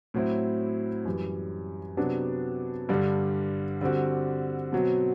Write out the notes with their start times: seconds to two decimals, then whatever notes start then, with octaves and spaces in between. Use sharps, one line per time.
0.14 A2 F#3 C4 E4
1.05 F#2 E3 G3
1.97 C3 F#3 B3 D4
2.89 G2 D3 G3
3.81 D3 G3 C4 F#4
4.73 B2 F#3 C4